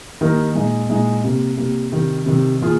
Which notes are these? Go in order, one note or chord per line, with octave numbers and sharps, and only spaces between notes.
D#3 G3 A#3 D#4 A#4
A#2 G#3 D#4
A#2 G#3 D#4
C3 G3 A#3
C3 G3 A#3
C3 D#3 G3
C3 D#3 G3
D#3 A#3 F4 G#4